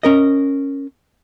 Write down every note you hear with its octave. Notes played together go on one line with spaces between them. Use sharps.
C#4 A#4 D#5